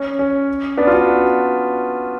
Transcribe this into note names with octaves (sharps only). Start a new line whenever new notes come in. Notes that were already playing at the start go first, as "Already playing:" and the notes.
Already playing: C#4
C#4
B3 D4
F4
D4 F#4